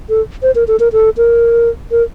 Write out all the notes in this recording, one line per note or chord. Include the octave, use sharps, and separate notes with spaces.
A4
C5
A#4
A4
A#4
A4
A#4
A#4